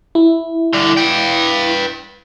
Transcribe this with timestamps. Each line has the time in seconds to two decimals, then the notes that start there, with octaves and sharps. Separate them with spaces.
0.15 E4
0.73 D3 G3
0.97 B4 G5